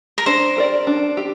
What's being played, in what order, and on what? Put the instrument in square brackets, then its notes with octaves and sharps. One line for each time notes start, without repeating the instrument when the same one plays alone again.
[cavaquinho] A#4
[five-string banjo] D4 [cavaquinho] C5
[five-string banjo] G4 A#4 D5
D4
G4